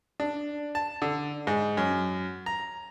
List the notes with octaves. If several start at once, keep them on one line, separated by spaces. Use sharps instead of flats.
D4
A5
D3
G#2
F#2
A#5